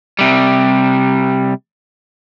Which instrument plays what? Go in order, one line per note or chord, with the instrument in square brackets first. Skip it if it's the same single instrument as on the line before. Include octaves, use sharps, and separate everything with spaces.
[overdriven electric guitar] C3 G3